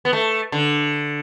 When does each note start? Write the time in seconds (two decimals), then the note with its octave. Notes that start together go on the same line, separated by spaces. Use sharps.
0.05 B3
0.13 A3
0.52 D3